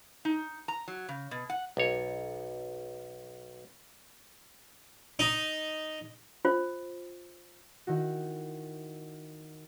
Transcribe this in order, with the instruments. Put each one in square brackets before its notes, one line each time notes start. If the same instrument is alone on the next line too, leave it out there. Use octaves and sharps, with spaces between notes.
[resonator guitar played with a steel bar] D#4
A#5
F#3
C#3
B2
F#5
[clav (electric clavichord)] B1 C#5
[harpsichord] D#4
[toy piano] F4 C5
[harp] D#3 E4 F#4